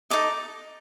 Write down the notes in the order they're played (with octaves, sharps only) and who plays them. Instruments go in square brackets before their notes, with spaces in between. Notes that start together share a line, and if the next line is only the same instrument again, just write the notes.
[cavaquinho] D#4 A4 D#5 D6